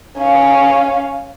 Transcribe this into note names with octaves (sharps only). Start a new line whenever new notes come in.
C#4 F5